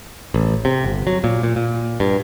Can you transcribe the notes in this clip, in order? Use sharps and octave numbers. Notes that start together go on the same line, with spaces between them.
A1
C3
G1
F#3
A#2
A#2
A#2
G2